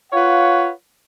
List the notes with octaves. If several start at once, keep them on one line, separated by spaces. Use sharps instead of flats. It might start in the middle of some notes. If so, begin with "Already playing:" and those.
F4 B4 C#5 F5 F#5